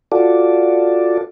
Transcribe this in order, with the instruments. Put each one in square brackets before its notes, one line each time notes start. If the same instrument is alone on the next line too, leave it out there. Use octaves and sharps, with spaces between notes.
[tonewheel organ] F4 F#4 A4 D5